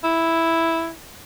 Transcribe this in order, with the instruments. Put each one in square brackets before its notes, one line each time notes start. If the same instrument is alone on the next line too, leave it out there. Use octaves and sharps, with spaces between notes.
[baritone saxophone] E4